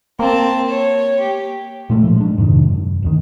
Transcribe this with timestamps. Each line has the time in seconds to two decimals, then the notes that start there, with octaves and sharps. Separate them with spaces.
0.19 A#3 C4 A5
0.69 C#5
1.20 G4
1.90 A#2 G#3 A3
2.03 A2 F3
2.16 G#3 D4
2.38 F2 G#2 C3 D#3
2.63 F#2
3.03 F1 D2 D#3